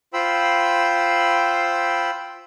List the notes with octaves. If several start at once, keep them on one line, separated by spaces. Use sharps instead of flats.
F4 C5 G5 B5 E6